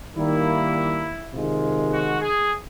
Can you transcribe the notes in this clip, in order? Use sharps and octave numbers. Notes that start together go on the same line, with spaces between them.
D#3 G3 A#3 E4
C3 D#3 G#3 F4
F#4
G#4